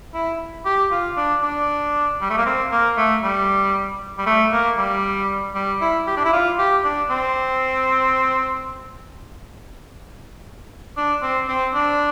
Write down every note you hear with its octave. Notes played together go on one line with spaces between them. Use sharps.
E4
G4
F4
D4
D4
G3
A3
A#3
C4
A#3
A3
G3
G3
A3
A#3
G3
G3
E4
G4
D4
E4
F4
G4
D4
C4
D4
C4
C4
D4